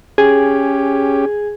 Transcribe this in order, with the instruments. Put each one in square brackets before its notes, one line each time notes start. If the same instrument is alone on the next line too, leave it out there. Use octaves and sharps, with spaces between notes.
[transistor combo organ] C#4 G4 [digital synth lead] G#4